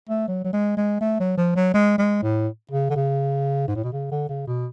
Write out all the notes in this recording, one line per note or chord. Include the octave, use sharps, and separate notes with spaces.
A3
F#3
F#3
G#3
G#3
A3
F#3
F3
F#3
G#3
G#3
A2
C#3
D3
C#3
G#2
A2
B2
C#3
D3
C#3
B2